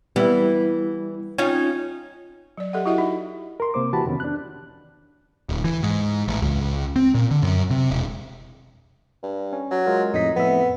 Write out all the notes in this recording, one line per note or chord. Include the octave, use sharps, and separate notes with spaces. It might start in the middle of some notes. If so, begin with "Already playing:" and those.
E3 G3 B3 E4
C#4 D#4 F4 C#5
F#3 D5
G4 A4 D#5 E5 F#5
E4 F#4 G4 D#5 E5 F#5
D#4 E5
A#4 C6
C3 A#3 C5 D6
E3 F#4 G4 A5 B5
F2 C3 D#3 B3 C#4
D4 F#6
D1
E3
G#2
A1
C#2
C4
A#2
D3
F#2
C3
E1
G2
C#4
F#3
G#3 F4 A#4
F2 A2 D#4 B6
F2 A2 B3 E5